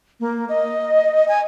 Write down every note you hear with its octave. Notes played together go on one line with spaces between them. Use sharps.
A#3
D#5
G#5